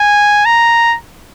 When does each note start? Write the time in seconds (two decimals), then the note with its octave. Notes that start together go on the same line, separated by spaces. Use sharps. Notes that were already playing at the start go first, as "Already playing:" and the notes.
Already playing: G#5
0.46 A#5